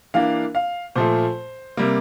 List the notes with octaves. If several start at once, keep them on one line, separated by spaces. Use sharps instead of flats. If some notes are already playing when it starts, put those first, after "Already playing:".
E3 A#3 D4 F5
F5
A#2 F3 A3 C5
C3 G3 A#3